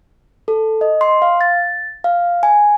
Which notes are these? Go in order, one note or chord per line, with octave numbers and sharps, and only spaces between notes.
A4
D#5
C6
F5
A6
F5
G#5